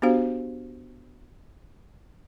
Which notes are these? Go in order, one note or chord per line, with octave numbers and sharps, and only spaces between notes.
B3 D4 F#4 G4 C5 F5